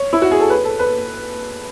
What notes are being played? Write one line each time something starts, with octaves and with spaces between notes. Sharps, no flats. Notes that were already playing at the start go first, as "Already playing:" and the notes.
Already playing: C#5
E4
F#4
G#4
A4
B4
A4
B4